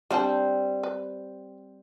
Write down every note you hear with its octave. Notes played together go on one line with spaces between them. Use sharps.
G3 C4 D4 C5 F5 A5
B4